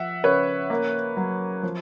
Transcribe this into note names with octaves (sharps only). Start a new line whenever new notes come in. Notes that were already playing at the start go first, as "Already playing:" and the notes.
Already playing: F3 E5 F#5
C#3 B4 C#5
A#3
F#3
F3